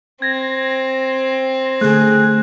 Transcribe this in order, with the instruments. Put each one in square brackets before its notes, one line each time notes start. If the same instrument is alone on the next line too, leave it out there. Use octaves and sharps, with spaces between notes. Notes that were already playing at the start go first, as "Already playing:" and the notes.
[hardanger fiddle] C4 [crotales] G#6 A#6
[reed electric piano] D3 A3 [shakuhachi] G#4 [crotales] F#6